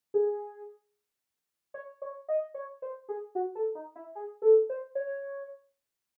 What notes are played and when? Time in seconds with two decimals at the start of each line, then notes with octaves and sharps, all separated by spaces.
0.14 G#4
1.74 C#5
2.02 C#5
2.29 D#5
2.54 C#5
2.82 C5
3.09 G#4
3.35 F#4
3.55 A4
3.75 D#4
3.95 E4
4.15 G#4
4.42 A4
4.69 C5
4.95 C#5